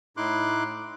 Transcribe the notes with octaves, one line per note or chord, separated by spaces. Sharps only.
A2 D#4 E4 C6 D6 F#6